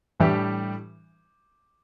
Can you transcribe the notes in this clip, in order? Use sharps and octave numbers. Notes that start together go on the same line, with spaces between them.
A2 E3 G3 D4 G4